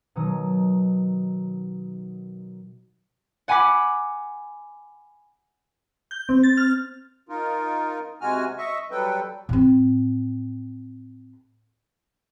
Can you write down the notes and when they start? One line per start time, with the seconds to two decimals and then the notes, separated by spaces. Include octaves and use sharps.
0.16 B2 D#3 F#3 D#6
3.48 F#5 G#5 B5 D6 B6
6.11 G6
6.29 C4
6.43 A6
6.57 F6
7.29 D#4 F4 A#4
8.21 C3 G#3 F#4 G#5 F6
8.58 D#5 E5 C#6
8.91 F#3 G3 A4 B4 G5
9.49 A2 C4